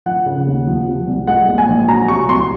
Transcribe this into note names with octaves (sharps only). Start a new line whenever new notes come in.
F3 F#5
C#3
D#2
F3
C3
C2
G#3 F#5
A#2
G#5
A#1
F#3 A#5
C3 C#6
C2 C6